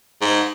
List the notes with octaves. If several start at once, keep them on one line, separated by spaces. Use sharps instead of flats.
G#2